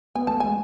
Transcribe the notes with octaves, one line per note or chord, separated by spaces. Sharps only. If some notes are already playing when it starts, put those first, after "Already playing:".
B3 G#5
A3 A5
G#3 G#5